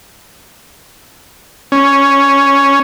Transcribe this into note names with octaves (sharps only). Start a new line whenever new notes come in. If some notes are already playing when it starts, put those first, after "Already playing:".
C#4